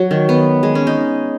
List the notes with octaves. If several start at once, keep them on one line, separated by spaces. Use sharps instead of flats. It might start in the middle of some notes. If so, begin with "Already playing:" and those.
Already playing: F#3
D#3
B3
G#3
C#4
D#4